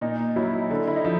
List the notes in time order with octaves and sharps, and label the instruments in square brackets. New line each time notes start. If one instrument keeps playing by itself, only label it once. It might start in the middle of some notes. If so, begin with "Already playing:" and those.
[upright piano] A#2 [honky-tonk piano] D#4
[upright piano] F#3 [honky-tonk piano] E4
[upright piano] D3
[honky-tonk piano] E4
D#4
[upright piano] F3